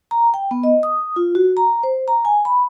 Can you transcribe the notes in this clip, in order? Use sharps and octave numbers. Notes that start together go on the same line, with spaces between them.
A#5
G5
B3
D#5
D#6
F4
F#4
A#5
C5
A#5
G#5
B5